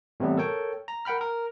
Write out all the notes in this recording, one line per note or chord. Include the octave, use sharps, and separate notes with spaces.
A2 C3 E3 G3 B3
A4 A#4 C#5 G5
A#5
A#4 F#5 G5 B5 F6
A#4